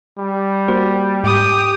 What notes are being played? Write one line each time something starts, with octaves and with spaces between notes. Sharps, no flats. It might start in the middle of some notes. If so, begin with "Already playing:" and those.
G3
A#3 F#4 C5
G#2 G4 D#6